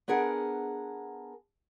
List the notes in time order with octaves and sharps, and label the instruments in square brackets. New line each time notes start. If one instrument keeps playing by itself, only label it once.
[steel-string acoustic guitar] B3 D4 G#4 A#4 F#5